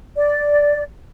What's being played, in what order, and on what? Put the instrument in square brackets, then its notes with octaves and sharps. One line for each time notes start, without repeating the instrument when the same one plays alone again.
[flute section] D5